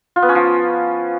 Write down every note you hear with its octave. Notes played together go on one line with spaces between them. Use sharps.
F4
B3
C#4
F3